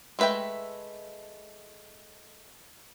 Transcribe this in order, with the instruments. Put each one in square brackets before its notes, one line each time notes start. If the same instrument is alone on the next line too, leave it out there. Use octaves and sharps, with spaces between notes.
[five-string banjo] G#3 A3 B4 E5 G5